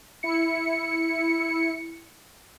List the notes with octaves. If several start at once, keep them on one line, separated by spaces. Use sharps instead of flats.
E4 C#7